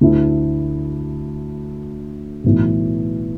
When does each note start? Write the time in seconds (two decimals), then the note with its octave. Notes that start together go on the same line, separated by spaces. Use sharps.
0.01 D2 D3 A3 E4
2.44 B1 A2 E3